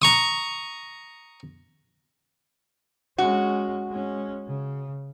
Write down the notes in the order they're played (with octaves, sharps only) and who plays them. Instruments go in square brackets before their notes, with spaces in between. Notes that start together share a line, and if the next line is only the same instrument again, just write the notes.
[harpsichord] A#5 C#6 D#6
[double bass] G#3 C#4 [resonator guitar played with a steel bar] F#4
[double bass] G#3 C#4
C#3